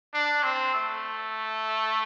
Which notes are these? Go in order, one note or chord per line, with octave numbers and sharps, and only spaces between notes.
D4
C4
A3